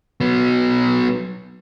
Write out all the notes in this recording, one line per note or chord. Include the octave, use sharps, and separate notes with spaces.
F#3 B3